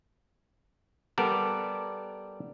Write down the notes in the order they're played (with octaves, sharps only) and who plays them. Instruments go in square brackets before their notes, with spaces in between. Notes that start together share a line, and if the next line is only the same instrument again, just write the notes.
[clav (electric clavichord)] G3 B3 A4 A#4 D5